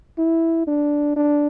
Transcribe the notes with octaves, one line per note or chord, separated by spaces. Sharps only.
E4
D4
D4